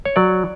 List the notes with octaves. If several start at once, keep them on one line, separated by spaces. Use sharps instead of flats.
C#5
F#3 D5